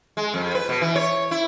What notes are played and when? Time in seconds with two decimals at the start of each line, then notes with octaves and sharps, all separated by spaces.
0.17 G#3
0.34 F2
0.55 B4
0.69 B2
0.81 E3
0.96 C#5
1.31 E4